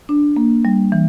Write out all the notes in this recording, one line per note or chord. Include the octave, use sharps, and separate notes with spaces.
D4
A#3
G3
E3